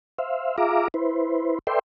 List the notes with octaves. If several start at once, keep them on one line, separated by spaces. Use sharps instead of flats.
C5 E5 F5
F4 G#4 E5 F5 A#5 D6
E4 B4 C5
A4 B4 D5 E5 G5 C6